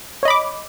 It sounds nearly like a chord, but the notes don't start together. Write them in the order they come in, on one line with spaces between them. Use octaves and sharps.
C#5 D#5 B5 D6